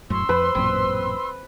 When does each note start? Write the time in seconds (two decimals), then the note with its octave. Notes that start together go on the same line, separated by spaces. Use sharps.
0.10 E1 F#2 A2 C#4 C6 E6
0.29 F2 C4 B4
0.55 A1 F#2 A#2 C4